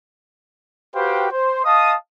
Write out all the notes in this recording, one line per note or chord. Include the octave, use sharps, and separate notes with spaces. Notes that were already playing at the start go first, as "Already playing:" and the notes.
F#4 G4 B4 C5 F5 G5
C5
D#5 F5 A5 D#6